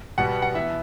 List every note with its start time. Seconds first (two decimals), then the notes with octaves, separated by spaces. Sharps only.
0.18 B2 G3 B3 F#5
0.42 F#5
0.54 E3 B3 E5